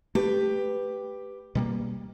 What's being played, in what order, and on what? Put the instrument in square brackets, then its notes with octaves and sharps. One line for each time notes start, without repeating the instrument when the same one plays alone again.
[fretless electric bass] A3 [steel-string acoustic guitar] G4 B4
[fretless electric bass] B2 G3 A#3